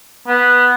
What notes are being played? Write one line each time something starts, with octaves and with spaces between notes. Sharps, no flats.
B3